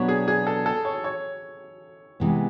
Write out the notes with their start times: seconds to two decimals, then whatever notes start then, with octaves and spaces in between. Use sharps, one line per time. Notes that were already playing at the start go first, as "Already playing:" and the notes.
Already playing: B2 F#3 B3 D4 G4 C#5
0.08 G#4
0.28 G#4
0.47 A4
0.66 A4
0.85 C#5
1.04 C#5
2.20 C3 E3 G#3 B3